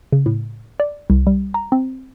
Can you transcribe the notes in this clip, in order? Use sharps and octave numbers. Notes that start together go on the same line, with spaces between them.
C#3
A2
D5
C2
G3
A#5
C4